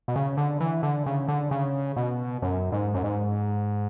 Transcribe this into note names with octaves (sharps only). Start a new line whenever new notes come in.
B2
C#3
D3
E3
D3
C#3
D3
C#3
B2
F#2
G#2
F#2
G#2